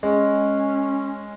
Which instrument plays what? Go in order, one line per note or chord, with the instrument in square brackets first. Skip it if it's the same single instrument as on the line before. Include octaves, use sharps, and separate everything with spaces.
[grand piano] G#3 [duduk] C#4